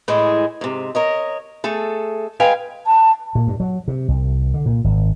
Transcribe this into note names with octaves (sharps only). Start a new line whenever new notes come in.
A2 E3 G#3 E4 G#4
G#2 C3
A#4 C#5 D#5
A3 G#4 A4
G#3 B4 F5 G5 G#5
A5
A#2
G2
F#3
C3
C2
D3
A#2
G#1